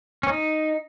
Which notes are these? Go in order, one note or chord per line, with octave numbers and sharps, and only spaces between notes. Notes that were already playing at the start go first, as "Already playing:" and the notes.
C#4
D#4